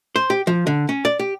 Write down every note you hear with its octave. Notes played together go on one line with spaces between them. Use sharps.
C5
G4
F3
D3
C#4
D5
G4